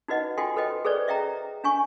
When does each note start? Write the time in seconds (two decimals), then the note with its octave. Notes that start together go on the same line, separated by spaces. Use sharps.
0.08 D#4 F#4 B4 D#5 F#5
0.37 F4 F#4 A4 G5 G#5 C6
0.56 A4 B4 C5 D#5 G5
0.85 G#4 A4 B4 C5 D5
1.07 D#5 E5 G5 A#5
1.64 D4 G#5 C#6